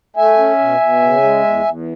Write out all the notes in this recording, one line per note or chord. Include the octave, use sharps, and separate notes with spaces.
A3 E5 G#5
C#4
B2
B2
C#3
G#3
E2
E2